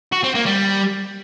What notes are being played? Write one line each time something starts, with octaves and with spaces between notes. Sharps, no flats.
F#4
C4
A#3
G3